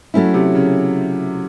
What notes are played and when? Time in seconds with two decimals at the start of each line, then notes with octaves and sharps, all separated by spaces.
0.14 F#3 A3 C#4 E4
0.34 C3
0.55 C#3